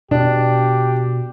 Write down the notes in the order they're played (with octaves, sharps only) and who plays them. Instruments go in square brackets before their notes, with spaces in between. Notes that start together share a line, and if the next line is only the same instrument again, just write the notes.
[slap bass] B2 [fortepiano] D4 [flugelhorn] G4